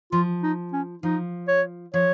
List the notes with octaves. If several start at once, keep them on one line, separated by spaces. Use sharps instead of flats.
F3 F4
D#4
C#4
F3 D#4
C#5
F3 C#5